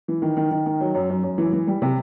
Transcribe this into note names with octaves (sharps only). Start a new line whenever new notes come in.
E3
D#3
D#3
D#3
D#3
F#3
F#2
F#2
F#2
E3
E3
G3
C3